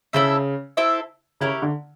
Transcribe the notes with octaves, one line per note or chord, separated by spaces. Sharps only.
C#3 E4 A4 C5 E5
E4 A4 C5 E5
C#3 E4 G4 A#4 C#5
D3